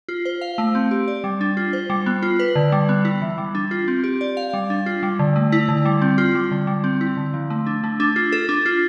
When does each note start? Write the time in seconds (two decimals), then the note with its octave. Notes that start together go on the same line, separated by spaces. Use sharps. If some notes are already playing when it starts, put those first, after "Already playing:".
0.09 F4
0.25 C5
0.41 F5
0.58 A3
0.75 C4
0.91 G4
1.08 D5
1.24 G3
1.41 D4
1.57 F4
1.73 C5
1.90 G3
2.06 B3
2.23 F4
2.39 B4
2.56 D3
2.72 G3
2.89 B3
3.05 E4
3.22 E3
3.38 G3
3.55 D4
3.71 F4
3.88 C4
4.04 G4
4.21 D5
4.37 F5
4.53 G3
4.70 D4
4.86 F4
5.03 G3
5.19 D3
5.36 A3
5.52 E4
5.69 D3
5.85 G3
6.02 C4
6.18 F4
6.35 G3
6.51 D3
6.67 G3
6.84 C4
7.01 E4
7.17 D3
7.34 F3
7.50 A3
7.66 D4
7.84 A3
8.00 D4
8.16 F4
8.32 A4
8.49 D4
8.66 F4